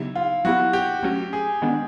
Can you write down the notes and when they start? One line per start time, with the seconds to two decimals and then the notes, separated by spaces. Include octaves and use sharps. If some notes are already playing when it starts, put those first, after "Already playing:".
Already playing: C#3 F#3 B3 D#4 E4 G4
0.16 F4
0.45 F#3 B3 E4 F#4 G4
0.73 G4
1.03 F#3 A3 C#4 F#4
1.33 G#4
1.62 D#3 G#3 B3 D4